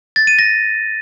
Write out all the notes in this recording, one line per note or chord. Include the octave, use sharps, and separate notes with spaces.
A6
D#7
A#6